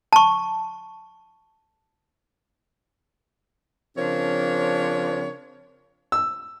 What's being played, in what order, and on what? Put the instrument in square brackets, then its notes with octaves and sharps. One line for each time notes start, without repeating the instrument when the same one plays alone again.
[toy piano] A5 C#6
[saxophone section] C#3 F3 C4 D4 A#4 C#5
[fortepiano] E6